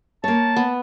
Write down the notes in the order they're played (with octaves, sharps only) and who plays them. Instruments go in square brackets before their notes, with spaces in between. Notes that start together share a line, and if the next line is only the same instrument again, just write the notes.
[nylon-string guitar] A#3 C#5 [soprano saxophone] A5
[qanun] B3